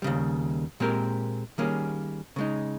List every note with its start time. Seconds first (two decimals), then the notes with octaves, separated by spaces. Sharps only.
0.02 D#2 C#3 G3
0.80 A#2 G#3 C4 G4 A#4
1.58 D#3 G3 A#3 C#4 G#4
2.36 C#3 G#3 D#4